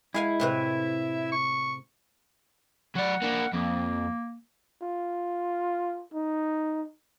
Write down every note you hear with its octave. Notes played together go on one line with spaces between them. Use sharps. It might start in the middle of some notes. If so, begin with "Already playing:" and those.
G#3 E4 F5 G#5
A2 C3 B4 E5
C#6
F#3 D5 F#5
A#3 D4
F2 A#3
F4
D#4